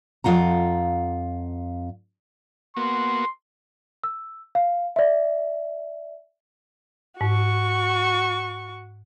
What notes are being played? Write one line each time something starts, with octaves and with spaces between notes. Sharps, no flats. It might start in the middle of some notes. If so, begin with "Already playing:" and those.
F2 F4 F#5 A#5
A#3 B3 F#4 C6
E6
F5
D5 E5
G#2 F#4 C#6